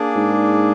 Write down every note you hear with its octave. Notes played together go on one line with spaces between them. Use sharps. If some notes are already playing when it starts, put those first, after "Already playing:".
Already playing: A#3 D4 G#4 D5
G#2